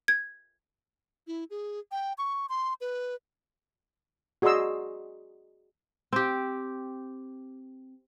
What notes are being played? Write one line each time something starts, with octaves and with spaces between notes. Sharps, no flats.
G#6
E4
G#4
G5
C#6
C6
B4
F#4 G#4 D5 D#5 C6 E6
C4 G4